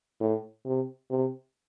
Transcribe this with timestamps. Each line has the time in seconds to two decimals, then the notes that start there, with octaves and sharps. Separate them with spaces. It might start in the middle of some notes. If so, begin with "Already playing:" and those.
0.20 A2
0.65 C3
1.11 C3